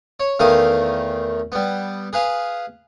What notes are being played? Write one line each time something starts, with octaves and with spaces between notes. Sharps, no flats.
C#5
E2 D#3 A3 E4 F5 D#6
G3 B3
G#4 B4 F5